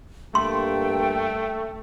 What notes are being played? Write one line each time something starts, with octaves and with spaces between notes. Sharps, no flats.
G2 A3 A#3 G5 C6